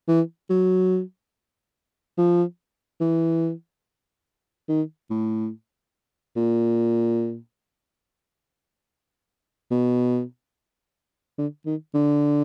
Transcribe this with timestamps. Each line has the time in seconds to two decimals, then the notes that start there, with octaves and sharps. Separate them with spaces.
0.08 E3
0.50 F#3
2.18 F3
3.01 E3
4.69 D#3
5.10 A2
6.36 A#2
9.71 B2
11.38 D3
11.66 D#3
11.95 D3